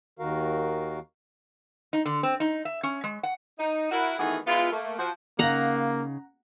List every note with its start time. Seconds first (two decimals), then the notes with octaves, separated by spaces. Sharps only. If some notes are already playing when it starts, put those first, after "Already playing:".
0.19 D#2 D#3 F#4 A#4 F5
1.93 D#4
2.06 D3
2.23 C4
2.40 D#4
2.65 E5
2.83 C#4
3.04 G#3
3.23 F#5
3.59 D#4
3.91 E4 F#4 A#4
4.19 D#3 E3 A3 B3 F#4 G#4
4.47 G#3 B3 E4 F4
4.72 A3 A#3
4.99 F3 F#4 C5
5.39 C#3 A#3 D#4 F#5 A#5